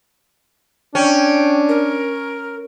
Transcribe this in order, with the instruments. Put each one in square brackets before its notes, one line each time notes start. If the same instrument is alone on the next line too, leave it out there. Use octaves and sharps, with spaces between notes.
[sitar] C#4 [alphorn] D4 [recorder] G5
[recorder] A#4